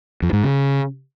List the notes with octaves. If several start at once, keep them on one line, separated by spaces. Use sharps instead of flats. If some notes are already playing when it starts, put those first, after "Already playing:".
F2
G#2
C#3